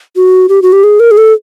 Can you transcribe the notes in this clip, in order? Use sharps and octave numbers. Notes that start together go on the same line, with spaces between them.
F#4
G4
F#4
G4
G#4
A#4
G#4
A4